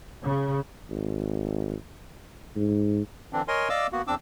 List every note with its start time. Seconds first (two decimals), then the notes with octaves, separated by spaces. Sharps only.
0.24 C#3
0.90 G#1
2.55 G#2
3.33 D3 E3 C4 D4
3.48 A#4 C#5 D#5 G#5 C6
3.69 D5 D#5 F5 D6 E6
3.92 A#3 B3 F#4
4.07 E2 C4 D4 D6 E6